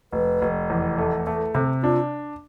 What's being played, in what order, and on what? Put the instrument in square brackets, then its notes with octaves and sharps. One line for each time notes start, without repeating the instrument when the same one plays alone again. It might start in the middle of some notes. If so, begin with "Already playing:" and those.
[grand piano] F1 [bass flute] B4
[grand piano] F1
E2
A3
[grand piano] A3 [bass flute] A4
[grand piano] C3 [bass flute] A4
[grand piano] D4 [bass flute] F4